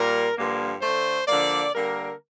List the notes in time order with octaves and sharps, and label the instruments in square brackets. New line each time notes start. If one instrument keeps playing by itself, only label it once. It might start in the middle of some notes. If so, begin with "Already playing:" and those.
Already playing: [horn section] A#2 G3 A#3 A#4
G2 D3 F3 A#3
D3 A3 C5
D3 F3 A#3 D5
D3 G3 A#3 A#4